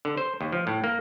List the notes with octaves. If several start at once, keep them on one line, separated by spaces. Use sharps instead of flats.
D3
C5
D#2
F3
A2
A#3